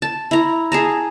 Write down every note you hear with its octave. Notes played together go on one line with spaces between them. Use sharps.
A5
E4 A#5
G#4 A5 A#5